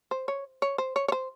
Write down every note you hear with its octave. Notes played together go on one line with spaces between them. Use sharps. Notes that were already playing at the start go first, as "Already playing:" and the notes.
C5
C#5
C#5
C5
C#5
C#5
C5